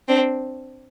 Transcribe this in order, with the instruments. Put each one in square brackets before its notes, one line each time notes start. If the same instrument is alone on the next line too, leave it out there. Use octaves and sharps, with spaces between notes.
[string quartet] C4 D4